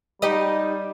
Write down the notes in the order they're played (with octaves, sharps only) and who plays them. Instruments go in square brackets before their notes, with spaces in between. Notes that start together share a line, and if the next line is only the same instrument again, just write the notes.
[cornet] G3 [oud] D#4 G4 D#5